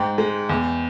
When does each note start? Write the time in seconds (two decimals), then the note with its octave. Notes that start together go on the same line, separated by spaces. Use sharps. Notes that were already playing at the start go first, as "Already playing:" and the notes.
Already playing: G#2 G5
0.18 G#3
0.49 E2